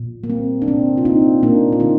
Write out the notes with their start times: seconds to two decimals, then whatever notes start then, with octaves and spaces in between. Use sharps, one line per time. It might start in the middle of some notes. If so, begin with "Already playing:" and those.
Already playing: A#2
0.24 A#3
0.30 G3 C4
0.62 D4
0.68 C3 C4
0.97 F4
1.05 A#3 C4 D#4
1.43 A#2 A#3 D4
1.72 F4
1.80 D3 C4 D#4